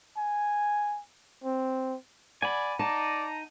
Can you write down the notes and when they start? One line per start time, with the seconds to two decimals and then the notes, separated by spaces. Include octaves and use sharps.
0.17 G#5
1.44 C4
2.42 D5 F#5 G#5 B5
2.79 D#4 D5 A5 A#5